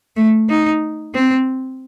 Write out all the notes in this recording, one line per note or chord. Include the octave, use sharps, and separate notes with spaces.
A3
D#4
C4